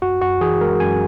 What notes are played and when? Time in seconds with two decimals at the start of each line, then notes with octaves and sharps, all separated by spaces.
0.02 F#2 F#4
0.22 F#2 F#4
0.41 E3 G#4
0.61 G#3 A#4
0.80 F#2 G#5